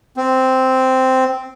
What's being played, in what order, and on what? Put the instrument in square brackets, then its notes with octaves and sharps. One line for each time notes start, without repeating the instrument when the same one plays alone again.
[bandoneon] C4